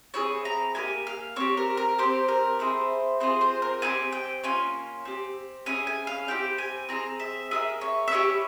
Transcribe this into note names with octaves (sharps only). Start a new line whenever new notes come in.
C4 E4 G#4 C#5
A#5
A#3 E4 G4 G#5
F5
C4 G4 C#5
A#4
A#4
C4 G4 C5
A#4
C4 E4 G#4 C5
C4 F4 G#4 C5
C5
A#4
C4 E4 G4 G#5
G5
A#3 C#4 F4 G#5
C4 G4
C#4 E4 G#4 G#5
G#5
F5
C4 E4 G4 G5
G#5
C4 E4 G#4 A#5
E5
A#3 F4 G#4 E5
C#5
E5
C#4 E4 G4 C#5